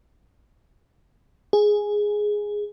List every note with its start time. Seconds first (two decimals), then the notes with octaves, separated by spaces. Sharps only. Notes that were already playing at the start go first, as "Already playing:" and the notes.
1.53 G#4